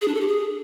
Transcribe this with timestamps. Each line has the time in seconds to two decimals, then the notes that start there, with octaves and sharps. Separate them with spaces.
0.02 G#4
0.08 D4
0.14 A4
0.21 G4
0.27 G#4